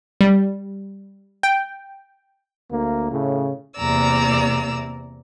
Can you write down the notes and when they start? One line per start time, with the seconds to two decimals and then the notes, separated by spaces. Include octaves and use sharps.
0.21 G3
1.43 G5
2.71 D2 A#3
3.11 A2 C#3
3.77 E2 C3 A#3 D5 A#5 E6